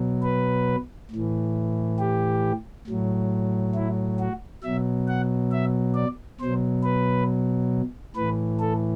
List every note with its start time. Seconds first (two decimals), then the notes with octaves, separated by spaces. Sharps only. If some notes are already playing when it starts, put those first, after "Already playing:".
Already playing: B2 F#3
0.23 B4
1.11 A2 E3
1.99 G4
2.87 A2 F#3
3.75 E4
4.19 F#4
4.63 B2 F#3 E5
5.08 F#5
5.52 E5
5.95 D5
6.40 B2 F#3 C5
6.83 B4
8.16 A2 E3 B4
8.60 A4